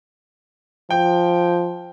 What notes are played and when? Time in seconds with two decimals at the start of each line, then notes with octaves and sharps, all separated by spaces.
0.90 F3 G5